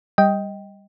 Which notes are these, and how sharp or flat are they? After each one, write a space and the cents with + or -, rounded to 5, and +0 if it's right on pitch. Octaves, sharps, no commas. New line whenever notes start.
G3 +10 D#5 +15 G5 +0